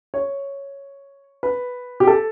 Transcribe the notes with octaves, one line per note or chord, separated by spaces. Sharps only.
C#5
B4
G4
A4